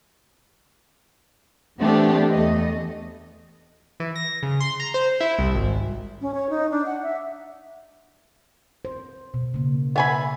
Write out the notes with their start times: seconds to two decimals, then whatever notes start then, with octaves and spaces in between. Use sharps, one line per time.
1.78 E3 A3 B3 C4 D4 G4
2.32 E2 A3 D#5
4.00 E3
4.16 A#6
4.43 C#3
4.60 C6
4.80 A#5
4.94 C5
5.20 E4
5.39 C2
5.54 G#1
6.21 C#4
6.34 C#5
6.50 D#4
6.71 D4
6.86 F#5
7.03 E5
8.85 C5
9.34 B2
9.54 C#3 A#3
9.96 B3 E5 G#5 B5